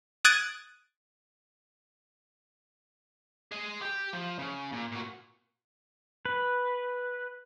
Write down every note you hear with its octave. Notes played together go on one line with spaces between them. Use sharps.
D#6 F#6 G#6 A6 D7 D#7
G#4 D#5
G4 G5
F3
C#3
A#2
A#2 F#4
B4